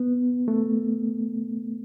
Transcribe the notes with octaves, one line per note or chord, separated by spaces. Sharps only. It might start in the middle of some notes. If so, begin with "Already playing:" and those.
Already playing: B3
A3